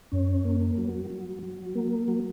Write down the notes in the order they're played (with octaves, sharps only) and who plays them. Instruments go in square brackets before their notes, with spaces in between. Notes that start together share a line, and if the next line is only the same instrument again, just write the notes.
[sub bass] F#2 [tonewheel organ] C#4
[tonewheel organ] A#3
F#3
F#3
F#3
A#3
F#3